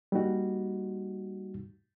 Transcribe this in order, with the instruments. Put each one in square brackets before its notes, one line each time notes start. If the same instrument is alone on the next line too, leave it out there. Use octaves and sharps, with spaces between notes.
[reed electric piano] G3 A#3 D#4 F#4